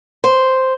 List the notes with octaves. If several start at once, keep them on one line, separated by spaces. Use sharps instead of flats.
C5